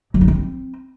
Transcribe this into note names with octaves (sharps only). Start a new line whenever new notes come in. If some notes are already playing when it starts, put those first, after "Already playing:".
F#3
D#4
C4